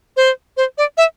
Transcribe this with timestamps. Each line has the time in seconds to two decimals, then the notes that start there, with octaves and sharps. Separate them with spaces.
0.17 C5
0.57 C5
0.78 D5
0.97 E5